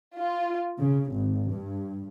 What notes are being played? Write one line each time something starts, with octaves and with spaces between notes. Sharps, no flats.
F4
C#3
G#1
G2